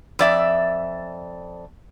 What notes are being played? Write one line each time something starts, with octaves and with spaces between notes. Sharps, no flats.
F2 D5 E5